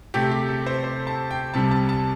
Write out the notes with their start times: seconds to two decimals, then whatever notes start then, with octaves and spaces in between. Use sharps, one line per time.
0.14 C3 A3 C4 G4
0.31 G4
0.49 A4
0.66 C5
0.84 C5
1.07 A5
1.31 G5
1.54 C2 C3 G3 A5
1.71 A5
1.89 A5